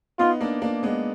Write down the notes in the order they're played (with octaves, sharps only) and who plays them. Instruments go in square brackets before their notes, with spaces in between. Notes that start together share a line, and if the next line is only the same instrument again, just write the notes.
[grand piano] B3 D#4 [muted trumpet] F4
[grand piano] A#3 D4
A#3 D4
G#3 B3